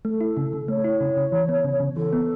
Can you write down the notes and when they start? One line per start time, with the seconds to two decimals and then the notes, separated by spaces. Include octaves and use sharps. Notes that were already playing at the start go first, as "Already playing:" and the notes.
0.05 A3 A4
0.21 E4
0.37 C#3
0.53 C#3
0.68 A3 C#5
0.84 E4
1.01 C#3
1.17 C#3
1.32 E3
1.49 B3
1.64 C#3
1.80 C#3
1.96 E3 A4
2.13 B3